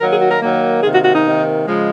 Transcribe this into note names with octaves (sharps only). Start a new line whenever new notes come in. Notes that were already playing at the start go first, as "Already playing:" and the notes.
D#3 F#3 A#3 A#4
G#4
F#4
A#4
D#3 F#3 A#3
C3 D#3 A#3 G#4
F#4
F#4
D#4
C3 D#3 A#3
C#3 F3 G#3